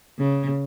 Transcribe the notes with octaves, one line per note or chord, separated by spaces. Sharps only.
C#3